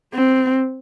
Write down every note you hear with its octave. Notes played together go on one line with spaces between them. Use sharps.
C4